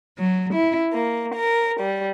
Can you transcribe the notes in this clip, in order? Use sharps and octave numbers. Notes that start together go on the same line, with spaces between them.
F#3
E4
A#3
A#4
G3